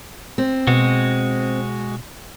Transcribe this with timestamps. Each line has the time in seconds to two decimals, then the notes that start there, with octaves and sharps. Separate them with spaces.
0.38 C4
0.67 B2 G#3 F#4